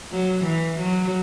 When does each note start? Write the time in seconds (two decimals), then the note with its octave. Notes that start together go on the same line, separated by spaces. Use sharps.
0.12 F#3
0.45 E3
0.79 F#3